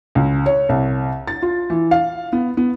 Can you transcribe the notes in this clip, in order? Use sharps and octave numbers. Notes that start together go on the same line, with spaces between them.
C#2
C#5
C2
A6
F4
E3
F5
B3
B3